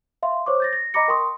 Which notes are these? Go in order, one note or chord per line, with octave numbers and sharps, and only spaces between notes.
E5 F5 C6
C5 C#5 C#6 D6
G6 A6 A#6
A#6
D#5 A#5 B5 D6 A#6 C#7
A#4 G5 C6 C#6 D#6